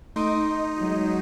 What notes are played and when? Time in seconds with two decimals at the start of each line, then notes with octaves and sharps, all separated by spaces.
0.16 A3 D#4 C6 D6 D#6
0.78 F#3 G#3